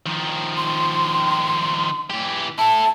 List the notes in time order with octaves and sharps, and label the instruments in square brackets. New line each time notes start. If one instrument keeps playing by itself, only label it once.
[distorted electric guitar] D#3 F3
[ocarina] C6
[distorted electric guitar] E3 G4
[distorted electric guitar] E4 A4 [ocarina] A5